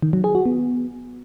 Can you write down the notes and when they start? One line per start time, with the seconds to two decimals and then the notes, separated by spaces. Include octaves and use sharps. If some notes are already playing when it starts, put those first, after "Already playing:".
0.02 D#3
0.13 F#3
0.24 G#4
0.35 F#4
0.46 B3